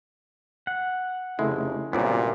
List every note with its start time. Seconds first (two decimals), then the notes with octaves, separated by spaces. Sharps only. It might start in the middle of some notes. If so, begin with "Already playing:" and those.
0.67 F#5
1.39 F1 C#3 G#3 A3 E4
1.93 G1 C2 F#2 A#2 B3 D5